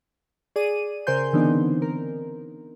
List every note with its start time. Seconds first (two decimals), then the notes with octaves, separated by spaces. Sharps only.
0.56 G#4 D5 D#7
1.07 C#3 A#4 C5 G#5 C6 G6
1.33 D3 E3 B3 C4 D4 D#4
1.82 A#4